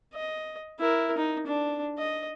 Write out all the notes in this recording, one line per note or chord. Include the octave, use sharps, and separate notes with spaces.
D#5
E4 A#4
D#4
D4
D#5